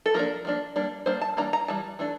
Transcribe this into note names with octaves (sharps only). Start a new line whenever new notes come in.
A4
F3 A#3 D4 A#4
F3 A#3 D4
G3 A#3 D4
G3 A#3 D4 C5
A5
E3 G3 A#3 D4 A#5
A#5
E3 G3 A5
E3 A3 D4